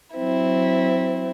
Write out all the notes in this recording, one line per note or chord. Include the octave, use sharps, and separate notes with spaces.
F#3 C4 E4